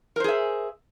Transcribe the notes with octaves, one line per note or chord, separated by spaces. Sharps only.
G#4 A#4 C5 E5